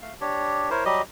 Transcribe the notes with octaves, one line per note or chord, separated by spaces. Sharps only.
A3 F5
D4 G4 C#5
E4 A#4 C5 C#5
F#3 G3 G4 D#5